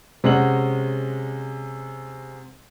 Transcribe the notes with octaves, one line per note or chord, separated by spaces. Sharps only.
C3 G#3 C#4 F#5 F#7